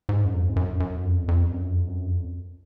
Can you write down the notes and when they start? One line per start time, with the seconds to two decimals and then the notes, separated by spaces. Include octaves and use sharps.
0.09 G#2
0.25 F#2
0.34 F2
0.49 G#2
0.56 F#2
0.80 F#2
1.05 F2
1.28 F2
1.51 F#2
1.70 F2
1.88 F#2
2.06 F2